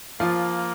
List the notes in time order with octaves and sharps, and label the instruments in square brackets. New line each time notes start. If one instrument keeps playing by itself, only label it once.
[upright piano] F3 F4 [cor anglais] A#3